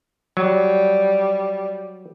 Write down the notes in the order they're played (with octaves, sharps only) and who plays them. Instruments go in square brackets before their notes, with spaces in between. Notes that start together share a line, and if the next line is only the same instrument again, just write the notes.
[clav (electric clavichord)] F#3 [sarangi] G3